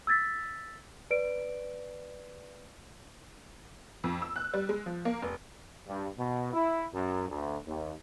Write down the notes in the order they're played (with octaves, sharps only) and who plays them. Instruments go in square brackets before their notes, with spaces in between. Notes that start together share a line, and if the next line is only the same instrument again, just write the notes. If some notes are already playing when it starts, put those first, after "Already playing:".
[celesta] E6 G#6 A6 B6
B4 D5 D7
[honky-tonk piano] F2
E6
F#6
G3
G#3
F3
A#3
F1
[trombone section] G2
B2
E4
F#2
D2
D#2